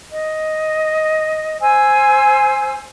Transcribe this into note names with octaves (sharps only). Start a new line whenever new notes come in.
D#5
C5 G#5 E6